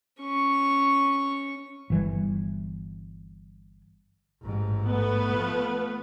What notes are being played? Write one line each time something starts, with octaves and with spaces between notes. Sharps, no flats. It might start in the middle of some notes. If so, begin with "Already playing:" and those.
C#4 C#6
G1 E3 G3
A1 G#2
A3 B3 B4
F3